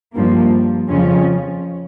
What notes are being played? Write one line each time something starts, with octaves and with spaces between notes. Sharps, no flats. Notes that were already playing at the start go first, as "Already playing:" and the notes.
G2 F3 A#3
F2 C#3 F3 C#4